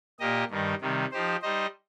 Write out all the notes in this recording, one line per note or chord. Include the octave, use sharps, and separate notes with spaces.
A#2 A#3 G4 D#5
G2 D#3 G3 D#4
C3 D#3 G3
F3 D#4 G4 C5
G3 D#4 C5 D#5